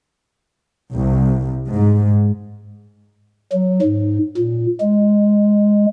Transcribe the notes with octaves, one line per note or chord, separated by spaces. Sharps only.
C2
G#2
F#3
G#2
A#2
G#3